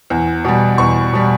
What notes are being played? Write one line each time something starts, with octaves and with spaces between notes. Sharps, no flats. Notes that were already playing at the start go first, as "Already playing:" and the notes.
E2
B2 G3
E2 C#6
B2 G3